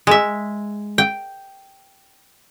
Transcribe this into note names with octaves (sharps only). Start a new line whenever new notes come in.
G#3 E5
G5